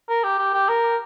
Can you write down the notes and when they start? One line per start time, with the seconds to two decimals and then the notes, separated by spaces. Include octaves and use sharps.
0.09 A#4
0.24 G4
0.38 G4
0.54 G4
0.69 A#4